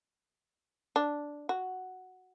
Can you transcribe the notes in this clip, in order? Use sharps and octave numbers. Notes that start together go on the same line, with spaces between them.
D4
F#4